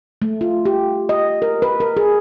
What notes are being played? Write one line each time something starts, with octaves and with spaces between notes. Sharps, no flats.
A3
F4
G4
D#5
A#4
B4
A#4
G#4